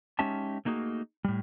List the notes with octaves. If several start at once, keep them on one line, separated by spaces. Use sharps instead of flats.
G#3 C#4 D#4 G4 E5 A5
A3 A#3 D#4 F#4 G#4
A2 G3